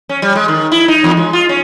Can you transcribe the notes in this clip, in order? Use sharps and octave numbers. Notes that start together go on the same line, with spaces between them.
C#4
G3
G#3
D#3
E4
D#4
E2
G#3
F4
C#4